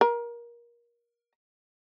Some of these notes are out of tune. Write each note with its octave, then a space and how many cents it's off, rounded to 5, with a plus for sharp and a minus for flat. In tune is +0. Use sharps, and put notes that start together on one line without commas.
A#4 +25